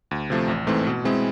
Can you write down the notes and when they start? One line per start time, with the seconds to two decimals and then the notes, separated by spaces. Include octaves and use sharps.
0.11 D2
0.30 C3 F3 A3 C4
0.48 A1
0.67 G#2 E3 A3 C4
0.86 B2
1.05 G#3 C4 E4 G#4